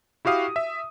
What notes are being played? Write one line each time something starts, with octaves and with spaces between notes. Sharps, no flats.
E4 F#4 G4 F5 D#6
E5